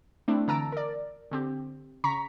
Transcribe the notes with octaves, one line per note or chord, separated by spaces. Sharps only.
A3 C4 D4 E4
D3 E3 A5 A#5 E6 D7
A#4 D5
D3 C4 G4
C#3 A#5 C#6 B6